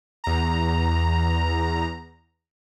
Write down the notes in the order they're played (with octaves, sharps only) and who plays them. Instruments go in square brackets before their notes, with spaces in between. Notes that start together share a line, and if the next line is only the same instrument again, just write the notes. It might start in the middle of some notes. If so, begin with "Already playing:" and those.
[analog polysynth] E2 A#5